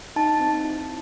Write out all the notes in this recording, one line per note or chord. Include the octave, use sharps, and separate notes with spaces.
D#4 A5
C4
E4